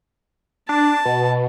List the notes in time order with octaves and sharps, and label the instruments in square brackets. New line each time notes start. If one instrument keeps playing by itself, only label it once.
[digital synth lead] D4 [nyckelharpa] A5
[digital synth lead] B2